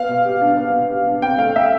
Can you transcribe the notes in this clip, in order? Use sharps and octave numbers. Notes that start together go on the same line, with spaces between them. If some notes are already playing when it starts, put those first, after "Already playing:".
Already playing: B3 F5
B2
G4
D4
B3
B2
G4
D4
C4 G5
A3 F5
A3 E5